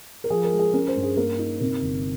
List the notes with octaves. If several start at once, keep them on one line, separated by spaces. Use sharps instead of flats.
A#4
F3 G#4
A#4
G#3
G#4
C#4 A#4
C5
G2
G#4
A#3 A#4
D#4
C3 A#4
G1